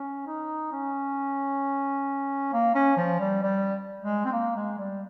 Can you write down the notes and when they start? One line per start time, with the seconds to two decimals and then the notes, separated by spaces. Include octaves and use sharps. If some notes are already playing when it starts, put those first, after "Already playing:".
Already playing: C#4
0.26 D#4
0.72 C#4
2.53 A#3
2.75 C#4
2.97 F3
3.20 G3
3.43 G3
4.02 G#3
4.25 C4
4.33 A#3
4.56 G#3
4.78 G3